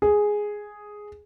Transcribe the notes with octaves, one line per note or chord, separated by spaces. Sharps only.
G#4